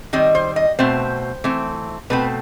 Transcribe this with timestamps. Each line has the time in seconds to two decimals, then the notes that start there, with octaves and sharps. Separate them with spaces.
0.13 D#3 G3 C4 D#5
0.35 C5
0.56 D#5
0.79 B2 A3 C4 C5
1.44 E3 A3 C4
2.10 B2 A3 C4 B4